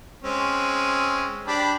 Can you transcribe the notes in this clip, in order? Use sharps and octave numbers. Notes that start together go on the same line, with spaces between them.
G#3 C4 C#4
D4 G4 B5